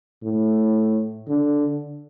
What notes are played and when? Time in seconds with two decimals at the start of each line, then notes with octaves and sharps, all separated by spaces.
0.24 A2
1.28 D3